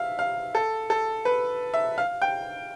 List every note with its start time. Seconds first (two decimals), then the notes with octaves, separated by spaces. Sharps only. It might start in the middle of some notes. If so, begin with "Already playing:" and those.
Already playing: E5 F5
0.19 F5
0.55 A4
0.90 A4
1.25 B4
1.74 E5
1.98 F5
2.22 G5